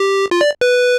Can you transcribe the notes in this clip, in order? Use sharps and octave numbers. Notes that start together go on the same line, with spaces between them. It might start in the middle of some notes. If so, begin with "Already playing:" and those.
Already playing: G4
F4
D5
B4